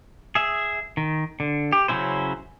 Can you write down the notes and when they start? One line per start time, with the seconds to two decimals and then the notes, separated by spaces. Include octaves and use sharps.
0.35 G#4 E5
0.97 D#3
1.40 D3
1.72 G4
1.88 C#3 F#3 C#4 E4 C5